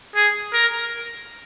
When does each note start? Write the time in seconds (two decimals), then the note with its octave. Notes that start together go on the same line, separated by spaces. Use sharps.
0.15 G#4
0.54 A#4